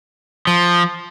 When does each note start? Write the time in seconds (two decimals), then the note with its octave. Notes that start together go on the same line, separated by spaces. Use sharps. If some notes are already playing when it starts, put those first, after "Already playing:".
0.47 F3